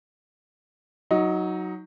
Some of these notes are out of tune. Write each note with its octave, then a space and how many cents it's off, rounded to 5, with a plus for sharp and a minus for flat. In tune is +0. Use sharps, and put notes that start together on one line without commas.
F#3 +0 D#4 +15